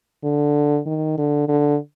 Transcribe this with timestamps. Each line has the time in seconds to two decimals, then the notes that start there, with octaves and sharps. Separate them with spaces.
0.24 D3
0.86 D#3
1.18 D3
1.48 D3